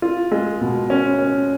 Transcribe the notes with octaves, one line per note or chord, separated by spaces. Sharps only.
F4
G#3
B2
C#4
C#4